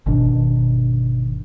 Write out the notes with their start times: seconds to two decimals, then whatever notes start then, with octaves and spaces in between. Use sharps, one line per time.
0.06 G1 B2 D#3 D4